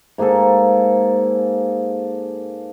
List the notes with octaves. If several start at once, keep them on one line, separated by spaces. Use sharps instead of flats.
G#2 A#3 G#4 A4